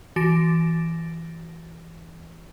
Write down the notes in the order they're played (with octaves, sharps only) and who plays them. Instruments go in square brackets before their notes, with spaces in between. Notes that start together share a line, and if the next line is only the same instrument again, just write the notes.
[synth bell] E3 F#4 A6 A#6 D7